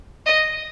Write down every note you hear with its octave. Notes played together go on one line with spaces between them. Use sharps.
D#5